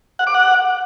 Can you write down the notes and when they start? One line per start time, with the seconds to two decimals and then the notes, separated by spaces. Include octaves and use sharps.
0.19 F#5
0.27 D6
0.34 F#5